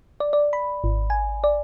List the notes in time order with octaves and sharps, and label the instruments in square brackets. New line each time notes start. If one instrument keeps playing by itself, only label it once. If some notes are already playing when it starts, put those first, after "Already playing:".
[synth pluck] D5
D5
B5
G#1
G#5
D5